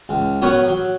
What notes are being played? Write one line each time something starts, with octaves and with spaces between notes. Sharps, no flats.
C#2
F#3 B3 A#4 B4 C#5
F#3